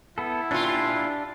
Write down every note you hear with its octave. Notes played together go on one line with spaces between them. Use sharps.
B3 E4 A4
A#2 D4 F4 G4